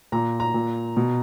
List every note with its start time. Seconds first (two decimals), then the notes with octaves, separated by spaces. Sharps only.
0.12 A#2 A#5
0.40 A#5
0.54 A#2
0.97 B2